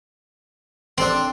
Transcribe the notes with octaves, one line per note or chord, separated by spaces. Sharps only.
C4 D4 A4 C6